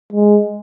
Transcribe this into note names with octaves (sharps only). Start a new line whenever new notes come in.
G#3